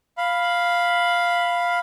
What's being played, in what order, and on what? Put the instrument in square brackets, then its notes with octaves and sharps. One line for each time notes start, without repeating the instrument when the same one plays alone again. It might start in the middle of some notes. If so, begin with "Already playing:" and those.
[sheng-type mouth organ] F5 B5